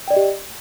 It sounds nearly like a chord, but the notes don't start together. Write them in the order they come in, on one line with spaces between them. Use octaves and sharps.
G5 D5 D#5 G4